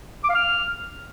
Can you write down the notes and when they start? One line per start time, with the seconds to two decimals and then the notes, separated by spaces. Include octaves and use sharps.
0.24 D6
0.30 F5
0.35 F6